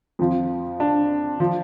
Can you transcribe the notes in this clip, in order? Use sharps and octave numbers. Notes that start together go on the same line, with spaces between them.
F2 F3
D4
F3